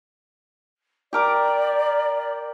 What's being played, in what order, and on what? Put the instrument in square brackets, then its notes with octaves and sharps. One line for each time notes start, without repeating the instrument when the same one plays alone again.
[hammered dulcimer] G4 A#4 D6 [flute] D5